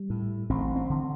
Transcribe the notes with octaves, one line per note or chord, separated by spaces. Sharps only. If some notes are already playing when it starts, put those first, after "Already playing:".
Already playing: G3
A2
A1 C4
C4
D3